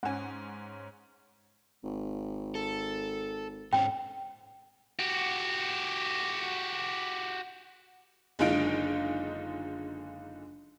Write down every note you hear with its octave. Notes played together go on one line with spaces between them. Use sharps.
G#2 C#4 F#5 G#5
G#1
A4
G#2 C4 C#4 G5
F#4 G4
F#1 D3 G#3 D#4 F4 D7